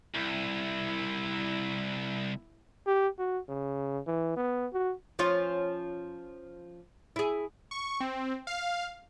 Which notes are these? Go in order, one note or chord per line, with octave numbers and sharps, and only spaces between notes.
C2 E4
G4
F#4
C#3
E3
B3
F#4
F3 C#4 F4
E4 G#4
C#6
C4
F5